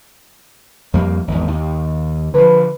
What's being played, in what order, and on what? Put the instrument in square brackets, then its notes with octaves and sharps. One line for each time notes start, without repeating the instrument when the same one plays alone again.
[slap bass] F2 G3 A#3
G#1 E2
D#2
[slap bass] D3 F3 [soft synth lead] B4